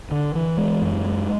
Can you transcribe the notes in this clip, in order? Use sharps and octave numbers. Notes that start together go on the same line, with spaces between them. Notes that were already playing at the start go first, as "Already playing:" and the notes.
D3
E3
G#3
F#2
G#3